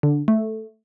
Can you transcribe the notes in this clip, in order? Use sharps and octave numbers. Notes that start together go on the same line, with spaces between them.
D3
A3